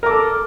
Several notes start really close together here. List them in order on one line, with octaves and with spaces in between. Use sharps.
A#4 D6 A4